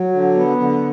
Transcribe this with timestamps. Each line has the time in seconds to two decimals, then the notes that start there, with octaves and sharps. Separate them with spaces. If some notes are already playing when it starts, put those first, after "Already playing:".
Already playing: F#3
0.13 D3
0.36 B3
0.58 D3